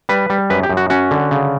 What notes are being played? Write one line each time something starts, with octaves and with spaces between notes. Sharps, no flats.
G3 B4
G3
F#2 B4
G4
F#2
F#4
C#4 F#4
D3
C#3